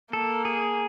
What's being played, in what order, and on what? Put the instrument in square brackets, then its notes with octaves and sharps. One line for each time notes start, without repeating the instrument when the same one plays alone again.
[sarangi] A#3 [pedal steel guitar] A4
[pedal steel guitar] G#4